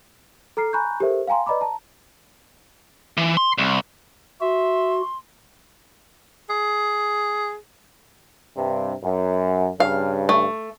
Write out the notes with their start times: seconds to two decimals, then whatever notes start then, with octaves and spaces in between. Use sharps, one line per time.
0.57 A4 A#5 F6 C7
0.73 G#5 A#5 B5 C#6 F#6 G6
1.00 G4 A4 A#4 C5 E5
1.27 F5 G5 G#5 A#5 C6
1.46 B4 D5 D#5 A#5 B5 D6
1.61 A5 A#5
3.17 E3
3.37 C6
3.58 C2
4.41 F#4 E5 C6
6.50 G#4
8.57 G2 C3
9.03 F#2
9.80 G2 C#3 F5
10.29 A3